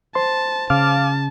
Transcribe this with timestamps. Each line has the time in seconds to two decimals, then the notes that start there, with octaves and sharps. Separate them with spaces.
0.15 C5 A5 C6
0.70 C#3 F5 A5 D6 F6